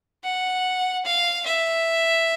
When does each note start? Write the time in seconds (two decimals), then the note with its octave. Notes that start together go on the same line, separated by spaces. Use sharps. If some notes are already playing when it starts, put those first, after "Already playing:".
0.24 F#5
1.05 F5
1.46 E5